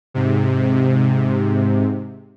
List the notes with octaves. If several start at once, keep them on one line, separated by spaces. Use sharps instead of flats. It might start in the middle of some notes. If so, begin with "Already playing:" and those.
G#2 C3